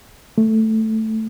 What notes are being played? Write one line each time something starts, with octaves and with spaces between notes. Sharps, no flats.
A3